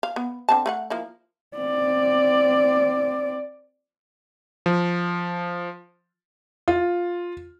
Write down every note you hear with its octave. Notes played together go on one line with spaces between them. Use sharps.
F5
B3
D3 C4 A5
A3 B4 F#5
F3 A#3 E4
C4 D5
F3
F4